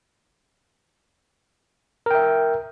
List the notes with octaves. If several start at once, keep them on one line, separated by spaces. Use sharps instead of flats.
A#4 E5 G5